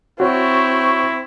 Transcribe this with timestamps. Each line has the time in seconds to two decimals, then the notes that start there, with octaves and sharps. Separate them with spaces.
0.20 C4 E4 F#4 C#5 C#6